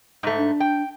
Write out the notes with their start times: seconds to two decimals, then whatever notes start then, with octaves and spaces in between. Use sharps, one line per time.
0.23 G#2 A3
0.37 D4
0.60 G5